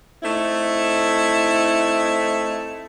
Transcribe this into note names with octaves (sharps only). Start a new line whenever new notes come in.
A3 C4 D#4 E4